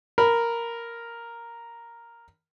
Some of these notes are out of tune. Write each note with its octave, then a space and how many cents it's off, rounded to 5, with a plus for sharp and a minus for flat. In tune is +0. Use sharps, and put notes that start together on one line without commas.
A#4 +0 B5 +0